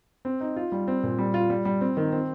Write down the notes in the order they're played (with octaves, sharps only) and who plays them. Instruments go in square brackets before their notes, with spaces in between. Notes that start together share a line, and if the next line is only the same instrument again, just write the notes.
[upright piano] C4
D#4
F4
G3
C4
A#2
G3
F4
G3
G3
C4
D#3
C4